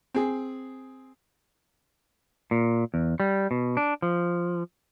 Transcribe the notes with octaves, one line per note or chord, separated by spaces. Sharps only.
C4 G#4
A#2
E2
G3
B2
D4
F3